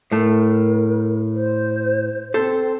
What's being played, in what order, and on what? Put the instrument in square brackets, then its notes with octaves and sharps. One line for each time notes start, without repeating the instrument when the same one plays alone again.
[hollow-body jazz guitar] A2 A3 [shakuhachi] A#4
[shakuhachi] C5
[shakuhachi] C4 [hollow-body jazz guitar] A4 C5